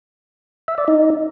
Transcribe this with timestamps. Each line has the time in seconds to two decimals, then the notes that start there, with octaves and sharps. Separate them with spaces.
0.68 E5
0.78 D5
0.88 D#4